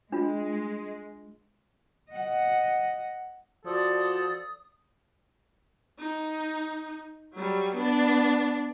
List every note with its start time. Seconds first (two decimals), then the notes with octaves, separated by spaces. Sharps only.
0.12 G#3 D4 F4
2.11 D#5 F#5
3.66 F3 F#4 A4 D5 D#6
5.99 D#4
7.34 F#3 G3
7.75 B3 D4